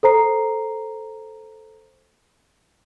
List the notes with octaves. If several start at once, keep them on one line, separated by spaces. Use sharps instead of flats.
A4 C5 A#5 C7